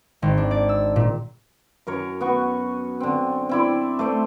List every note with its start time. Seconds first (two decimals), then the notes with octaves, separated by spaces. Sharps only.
0.22 G#1
0.37 D4
0.51 D5
0.69 E6
0.96 A#2
1.87 F#2 A#4 C#5
2.21 B3 F#4 C#6
3.00 D3 C4
3.49 C4 E4 D5
3.99 A3 C5 D5